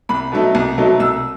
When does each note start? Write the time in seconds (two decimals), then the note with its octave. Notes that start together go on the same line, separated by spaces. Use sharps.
0.09 C2 B5
0.32 B2 F#3 A3 D#4
0.55 C2
0.78 B2 F#3 A3 D#4
1.00 C2 E6